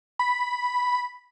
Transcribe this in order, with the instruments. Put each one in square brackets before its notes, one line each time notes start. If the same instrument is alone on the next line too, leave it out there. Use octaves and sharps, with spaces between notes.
[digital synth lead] B5